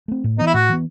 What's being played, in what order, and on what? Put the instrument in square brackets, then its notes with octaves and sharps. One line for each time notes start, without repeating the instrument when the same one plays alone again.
[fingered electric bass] A3 C4
A2
[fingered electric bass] E3 B3 [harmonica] D#4
[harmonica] E4
[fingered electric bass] A2 [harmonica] F#4
[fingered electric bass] E3 B3